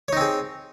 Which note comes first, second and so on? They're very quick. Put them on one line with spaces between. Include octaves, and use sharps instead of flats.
C#5 D#4 C4 G#4